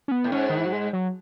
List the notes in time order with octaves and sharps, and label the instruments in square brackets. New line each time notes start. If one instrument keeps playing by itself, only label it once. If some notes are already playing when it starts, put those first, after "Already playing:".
[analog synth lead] C#4
B3
[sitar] A2
[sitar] G#2 [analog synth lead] C#4
[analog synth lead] D#3
E3
F#3
G#3
F#3